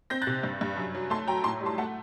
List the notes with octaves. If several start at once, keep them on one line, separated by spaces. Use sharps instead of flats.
C4 G6 A#6
F#6 A6
C3
G2
G2
F#2
F#3
A3 A5 C6
F#3 G5 A#5
A2 A5 C6
G3
A5 C6
A3 F#5 A5